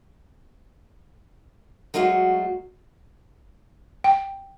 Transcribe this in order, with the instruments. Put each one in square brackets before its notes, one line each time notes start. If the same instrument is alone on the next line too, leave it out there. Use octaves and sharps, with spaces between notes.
[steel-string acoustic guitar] F#3 G#3 A3 F4 F#4
[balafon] G5